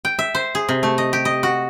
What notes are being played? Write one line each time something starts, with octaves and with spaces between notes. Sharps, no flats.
G5
E5
C5
G#4
C3
A3
D#5
G4
D#5
F#4